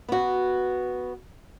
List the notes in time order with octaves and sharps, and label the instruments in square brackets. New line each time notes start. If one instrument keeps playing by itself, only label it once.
[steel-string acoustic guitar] B3 F#4